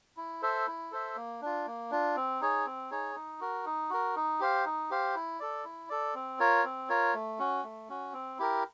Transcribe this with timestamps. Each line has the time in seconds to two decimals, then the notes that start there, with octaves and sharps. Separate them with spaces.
0.17 E4
0.42 A4 C5 E5
0.67 E4
0.91 A4 C5 E5
1.16 A#3
1.42 D4 F4
1.66 A#3
1.91 D4 F4
2.16 C4
2.41 D#4 G#4 C#5
2.66 C4
2.91 D#4 G#4 C#5
3.15 D#4
3.41 F#4 A#4
3.66 D#4
3.90 F#4 A#4
4.16 D#4
4.40 G4 C5 F5
4.65 D#4
4.90 G4 C5 F5
5.15 E4
5.40 A4 D5
5.65 E4
5.90 A4 D5
6.14 C4
6.40 F4 A#4 C#5
6.64 C4
6.89 F4 A#4 C#5
7.14 A3
7.39 C#4 F#4
7.64 A3
7.89 C#4 F#4
8.13 C4
8.39 E4 G4 A#4